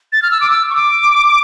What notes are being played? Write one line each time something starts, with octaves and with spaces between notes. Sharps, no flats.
A6
F6
E6
D6
E6
C#6
D6